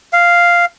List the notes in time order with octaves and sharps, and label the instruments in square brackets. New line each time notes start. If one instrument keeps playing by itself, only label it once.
[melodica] F5